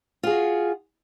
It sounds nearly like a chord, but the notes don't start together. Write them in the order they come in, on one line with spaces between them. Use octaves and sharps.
F4 G#4 F#4